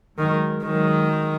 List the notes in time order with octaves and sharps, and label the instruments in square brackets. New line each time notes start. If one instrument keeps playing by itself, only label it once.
[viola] D#3 [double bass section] F#3 G#3
[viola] D#3 [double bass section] F#3 G#3